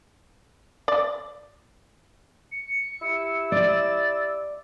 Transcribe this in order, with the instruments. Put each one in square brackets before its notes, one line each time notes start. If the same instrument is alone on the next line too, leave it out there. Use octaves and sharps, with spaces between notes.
[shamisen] D5
[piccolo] C#7
[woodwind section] E4 G4 E6
[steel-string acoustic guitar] D5 [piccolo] A6